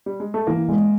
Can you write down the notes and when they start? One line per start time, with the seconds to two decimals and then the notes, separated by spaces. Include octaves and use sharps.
0.06 G3
0.20 G#3
0.34 A3
0.47 E3 A#3
0.68 G#3